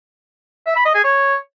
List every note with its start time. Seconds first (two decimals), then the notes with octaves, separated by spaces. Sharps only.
0.67 E5
0.76 B5
0.85 D#5
0.95 G#4
1.04 C#5